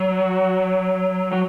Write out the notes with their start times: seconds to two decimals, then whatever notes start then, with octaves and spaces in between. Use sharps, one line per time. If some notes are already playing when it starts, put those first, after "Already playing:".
Already playing: F#3
1.32 F#3